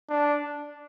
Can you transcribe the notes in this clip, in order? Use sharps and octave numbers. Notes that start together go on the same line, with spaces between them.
D4